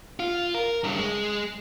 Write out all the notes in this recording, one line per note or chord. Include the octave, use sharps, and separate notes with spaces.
F4
A#4
G2 C#3
G#3